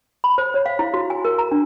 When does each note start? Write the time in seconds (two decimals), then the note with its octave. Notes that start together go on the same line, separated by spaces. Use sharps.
0.24 B5
0.38 C5
0.54 C#5
0.66 F5
0.79 E4
0.94 F#4
1.10 G#5
1.25 A#4
1.38 A#5
1.51 D4